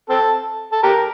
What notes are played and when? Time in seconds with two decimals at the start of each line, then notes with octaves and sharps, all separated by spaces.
0.09 C4 A4
0.72 A4
0.83 G4 A#4